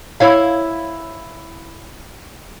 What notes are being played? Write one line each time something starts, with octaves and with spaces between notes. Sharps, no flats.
E4 C#5 F5